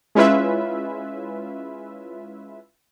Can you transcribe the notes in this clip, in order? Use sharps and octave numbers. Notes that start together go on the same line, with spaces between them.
G#3 C#4 E4 F4 B4 E5